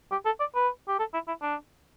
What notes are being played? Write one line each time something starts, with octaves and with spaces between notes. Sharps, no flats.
G4
A4
D5
B4
G4
A4
E4
E4
D4